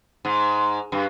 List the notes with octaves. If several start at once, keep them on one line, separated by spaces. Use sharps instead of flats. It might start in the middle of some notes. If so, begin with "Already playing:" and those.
G#2
G2